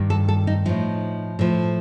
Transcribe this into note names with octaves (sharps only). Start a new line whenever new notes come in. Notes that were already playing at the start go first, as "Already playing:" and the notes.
Already playing: G2 D#3 G3
A4
A4
D#4
A2 F3 D#4
A2 F3